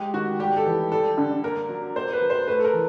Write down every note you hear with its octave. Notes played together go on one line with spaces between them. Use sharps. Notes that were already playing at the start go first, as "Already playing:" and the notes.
Already playing: G#3 G4
D#3 F#4
G3 G4
A4
E3
G3 A4
D3
A#3 A#4
F#3
A#3 C5
B4
F#3
C5
A3 B4
A4
A#4
E3